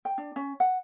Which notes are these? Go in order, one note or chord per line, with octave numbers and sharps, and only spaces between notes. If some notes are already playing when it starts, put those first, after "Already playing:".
G5
D4
C#4
F#5